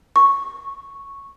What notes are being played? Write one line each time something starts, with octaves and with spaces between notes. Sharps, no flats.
C#6